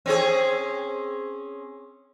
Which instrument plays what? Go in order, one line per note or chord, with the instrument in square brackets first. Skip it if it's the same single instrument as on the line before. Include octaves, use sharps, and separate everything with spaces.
[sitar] C4 C#4 G#4